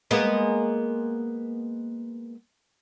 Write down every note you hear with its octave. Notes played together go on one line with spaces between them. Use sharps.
G#3 A#3 B3